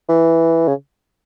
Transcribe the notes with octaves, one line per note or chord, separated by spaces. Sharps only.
E3
C#3